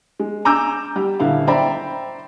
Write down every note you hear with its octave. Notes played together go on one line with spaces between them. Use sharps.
G#3
G#5 A#5 D6 E6 G6
G3
D#1 D3 E4 F5
C5 D5 E5 G5 A#5 B5